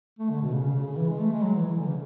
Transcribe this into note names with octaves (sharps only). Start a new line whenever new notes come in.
A3
D3
B2
C#3
C#3
C#3
C#3
E3
G#3
A3
G#3
F#3
E3
E3
D3
C#3